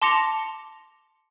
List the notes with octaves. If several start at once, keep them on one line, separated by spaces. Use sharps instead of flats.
A5 C6 D6 A#6 C#7 F7